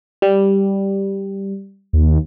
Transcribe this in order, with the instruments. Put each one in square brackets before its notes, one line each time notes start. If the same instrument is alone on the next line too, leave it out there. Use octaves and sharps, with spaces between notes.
[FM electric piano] G3
[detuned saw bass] D#2